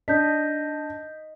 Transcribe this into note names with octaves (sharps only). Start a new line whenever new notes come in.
D4 D#5 G6 B6